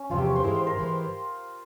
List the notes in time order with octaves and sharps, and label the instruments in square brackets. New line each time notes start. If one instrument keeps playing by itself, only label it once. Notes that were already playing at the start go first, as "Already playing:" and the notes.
Already playing: [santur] C#4
[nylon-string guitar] E2 C3 F3 [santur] F4
[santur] G4
C#5
C5
[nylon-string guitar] G#2 E3 G#3 E4 [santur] A#4
[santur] C5
A#4
[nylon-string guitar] G#2 E3 G#3 E4